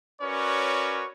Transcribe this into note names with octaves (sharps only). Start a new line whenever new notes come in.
C#4 F#4 A#4 B4 C#5 D5